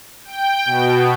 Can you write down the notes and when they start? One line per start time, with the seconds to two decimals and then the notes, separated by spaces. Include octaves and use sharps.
0.25 G5
0.65 B2